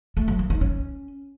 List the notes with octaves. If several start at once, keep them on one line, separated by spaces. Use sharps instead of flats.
A3
F#3
A#3
D#4
C#4